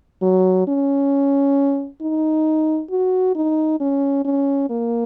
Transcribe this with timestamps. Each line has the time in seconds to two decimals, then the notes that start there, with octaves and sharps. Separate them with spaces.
0.23 F#3
0.68 C#4
2.02 D#4
2.91 F#4
3.35 D#4
3.80 C#4
4.25 C#4
4.70 A#3